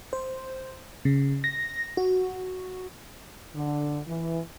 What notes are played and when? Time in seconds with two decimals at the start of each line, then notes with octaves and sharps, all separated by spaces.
0.13 C5
1.05 C#3
1.44 A#6
1.97 F#4
3.56 D3
4.08 E3